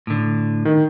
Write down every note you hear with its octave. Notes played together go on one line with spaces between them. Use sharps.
A2 D3
D#3